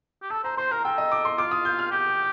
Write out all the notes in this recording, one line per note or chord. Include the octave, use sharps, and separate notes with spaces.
G4
A4 A5
C5 A#5
C5 C6
A#4 A#5
A4 G5
D#5
D6
C6
F4 D6
D#6
G6
F6
G4 G6